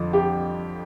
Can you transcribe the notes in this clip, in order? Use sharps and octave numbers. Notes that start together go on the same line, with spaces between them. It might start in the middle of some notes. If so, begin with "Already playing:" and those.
Already playing: F2 D3 F3
G4